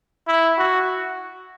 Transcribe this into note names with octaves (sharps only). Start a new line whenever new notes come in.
E4
F#4